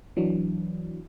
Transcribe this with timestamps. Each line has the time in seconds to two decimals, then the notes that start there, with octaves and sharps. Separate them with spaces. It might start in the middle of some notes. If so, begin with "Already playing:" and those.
0.17 E3 F#3 D4